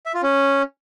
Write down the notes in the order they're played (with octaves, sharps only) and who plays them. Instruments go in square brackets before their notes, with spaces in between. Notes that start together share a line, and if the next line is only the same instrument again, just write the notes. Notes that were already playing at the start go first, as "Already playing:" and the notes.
[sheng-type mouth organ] E5
F4
C#4